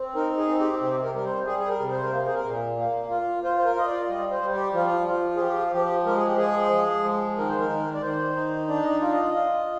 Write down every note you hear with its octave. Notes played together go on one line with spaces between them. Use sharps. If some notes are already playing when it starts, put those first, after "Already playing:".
Already playing: C4
D#4 A#4
G#4
C4
G4
C3 G4
A#4
G3 A#4
C5
G3 G#4
G#4
A#4
C3
C5
A#4
A#3 C5
G#4
A#4
A#2
A#3
F4
F4 C5
C5
A#4
F4 D#5
D5
G3 D#5
C5
G3
G4
F3 F4
F4
G#4
F3 G4
F3 G4
G#3 A#4
G#4
G4
F3 G#4
F3
G#3
D#3 A#4
C5
A#4
D#3
D5
D#3 C5
D#4
D4 D5
D#5
D5
F4 D5
D#5
F4